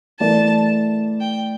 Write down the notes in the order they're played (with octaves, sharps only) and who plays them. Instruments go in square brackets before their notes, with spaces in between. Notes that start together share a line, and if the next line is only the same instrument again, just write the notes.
[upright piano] E3 A3 E4 A#4 D5 [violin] A5
[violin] G5